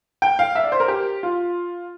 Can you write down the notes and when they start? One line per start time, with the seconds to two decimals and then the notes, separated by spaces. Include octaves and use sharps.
0.22 G5
0.39 F5
0.55 E5
0.64 D5
0.72 C5
0.80 A#4
0.88 G4
1.23 F4